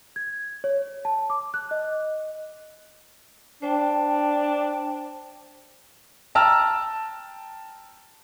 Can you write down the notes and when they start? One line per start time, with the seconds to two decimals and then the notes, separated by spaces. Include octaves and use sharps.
0.16 G#6
0.64 C#5
1.05 A5
1.30 D6
1.54 F#6
1.71 D#5
3.62 D4 C5 G5 A5
6.35 G5 A5 A#5 E6 F6